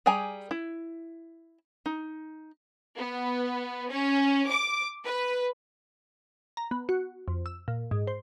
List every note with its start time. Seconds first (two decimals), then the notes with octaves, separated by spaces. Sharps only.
0.06 G3 G#4 G5 G#5 A#5
0.51 E4
1.86 D#4
2.96 B3
3.90 C#4
4.49 D6
5.04 B4
6.57 A#5
6.71 B3
6.89 F#4
7.28 F2
7.46 E6
7.68 A#2
7.91 G#2
8.07 C5